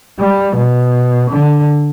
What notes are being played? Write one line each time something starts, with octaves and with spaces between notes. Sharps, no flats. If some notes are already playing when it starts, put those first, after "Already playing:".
G3
B2
D3